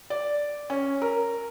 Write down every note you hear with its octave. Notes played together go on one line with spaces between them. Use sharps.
D5
C#4
A#4